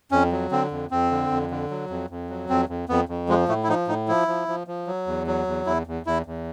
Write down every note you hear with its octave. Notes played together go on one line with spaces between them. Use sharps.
F2 C#4
F#3
D3 C4
F2
F2 C4
D3
F2
D3
F#3
F2
F2
F#3
F2 C4
F2
F2 B3
F2
F3 G#3
A2 A3
E4
F3 D#4
A2 D#4
F3 E4
F3
F3
F3
F#3
E2
F#3
E2
E2 E4
E2
E2 E4
E2